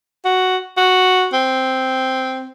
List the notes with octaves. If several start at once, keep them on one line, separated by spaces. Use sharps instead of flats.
F#4
F#4
C4